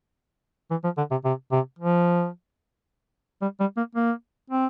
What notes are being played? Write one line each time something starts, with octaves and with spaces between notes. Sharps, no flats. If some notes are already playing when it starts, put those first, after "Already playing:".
E3
F3
D3
C3
C3
C3
F3
G3
G3
A#3
A#3
C4